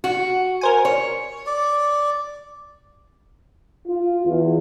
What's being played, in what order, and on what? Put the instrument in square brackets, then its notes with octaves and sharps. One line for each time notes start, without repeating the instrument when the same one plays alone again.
[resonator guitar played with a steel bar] F#4
[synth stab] A#4 C5 G#5
[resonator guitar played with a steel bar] C#5
[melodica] D5
[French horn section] F4
E2